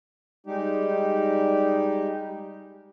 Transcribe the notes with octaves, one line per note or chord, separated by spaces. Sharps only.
G3 G#3 D#4 G4